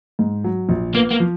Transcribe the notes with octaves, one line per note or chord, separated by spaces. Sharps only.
G#2
F#3
A#1
A#3 B3
A#3
F3